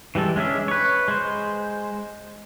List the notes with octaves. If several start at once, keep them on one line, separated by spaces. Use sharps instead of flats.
E3 G3 G#3 A4
G#3 C#4 D4 E5
B4 C#5
G#3 C5